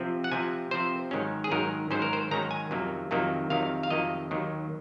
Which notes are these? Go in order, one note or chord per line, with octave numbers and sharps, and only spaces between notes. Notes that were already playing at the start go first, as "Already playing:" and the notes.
Already playing: C3 F3 C4
F#5
C3 F3 C4 G#5
C3 F3 C4 C5
G#2 D#3 F#3 C#4
G#4
G#2 D#3 F#3 C#4 A#4
G#2 D#3 F#3 C#4 C5
A#4
C5
G#2 D#3 F#3 C#4 A#5
G#5
F2 C3 D#3 F#3 A#3
F2 C3 D#3 F#3 A#3
F2 C3 D#3 F#3 A#3 F5
F5
F2 C3 D#3 F#3 A#3 D#5
D#2 D#3 F#3